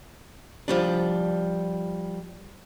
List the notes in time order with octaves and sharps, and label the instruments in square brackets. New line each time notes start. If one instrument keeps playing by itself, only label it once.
[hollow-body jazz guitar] F3 G3 D4